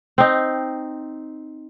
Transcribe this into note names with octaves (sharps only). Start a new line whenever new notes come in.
C4 D#4